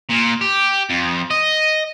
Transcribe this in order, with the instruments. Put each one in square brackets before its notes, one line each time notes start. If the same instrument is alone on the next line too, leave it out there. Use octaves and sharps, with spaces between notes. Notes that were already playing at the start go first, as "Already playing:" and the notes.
[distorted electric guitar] A#2
G4
F2
D#5